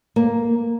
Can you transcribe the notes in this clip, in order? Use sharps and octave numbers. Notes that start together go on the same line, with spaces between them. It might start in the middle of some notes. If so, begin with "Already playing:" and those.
A#3